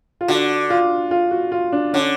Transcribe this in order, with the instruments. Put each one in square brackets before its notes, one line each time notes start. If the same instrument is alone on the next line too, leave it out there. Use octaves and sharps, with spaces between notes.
[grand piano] F4
[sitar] D3 [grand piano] F#4
[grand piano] F4
F4
F#4
F4
D4
[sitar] D3 [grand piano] C#4